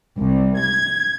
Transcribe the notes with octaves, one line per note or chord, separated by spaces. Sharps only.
C2
G#6